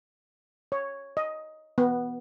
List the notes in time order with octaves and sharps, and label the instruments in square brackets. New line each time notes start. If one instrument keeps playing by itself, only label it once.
[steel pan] C#5
D#5
B3